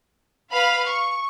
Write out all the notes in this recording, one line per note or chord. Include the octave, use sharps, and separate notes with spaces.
B4 F5 B5
C#6